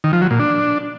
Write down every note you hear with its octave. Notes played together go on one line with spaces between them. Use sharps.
D#3
F3
F#3
A#2
D4